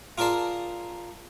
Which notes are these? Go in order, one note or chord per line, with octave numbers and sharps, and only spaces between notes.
F4 G#4 A#4 D5 A5 C6